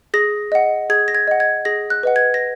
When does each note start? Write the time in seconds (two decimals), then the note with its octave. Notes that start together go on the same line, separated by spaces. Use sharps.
0.14 G#4 A#6
0.52 D#5 F#5
0.90 G#4 G#6
1.08 A#6
1.15 G#6
1.27 D#5 F#5
1.40 G#6
1.65 G#4 A#6
1.90 F#6
2.03 B4 D#5 F#5
2.16 G#6
2.34 A#6